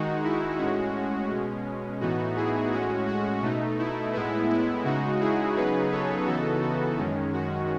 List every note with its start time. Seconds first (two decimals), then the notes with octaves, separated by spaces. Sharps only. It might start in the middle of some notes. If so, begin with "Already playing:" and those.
Already playing: D#3 G#3 D#4 F#4
0.24 E4
0.59 A2 G#3 C#4 F#4
1.31 B2 G#3 C#4
2.00 A2 E3 B3 D#4 F#4
2.36 E4 G#4
2.72 A2 G#3 C#4 F#4
3.07 F#4
3.43 B2 A3 D#4
3.79 E4
4.13 A2 G#3 B3 E4
4.50 E4
4.84 C#3 G#3 D#4 F#4
5.20 E4 G#4
5.56 C#3 F#3 B3 D#4 G#4 B4
5.92 A4 C#5
6.26 C#3 E3 B3 D#4 F#4 A4
6.63 F#4
6.98 F#2 D#3 G#3 C#4
7.33 F#4